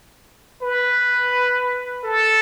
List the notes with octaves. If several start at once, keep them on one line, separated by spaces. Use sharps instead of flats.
B4
A4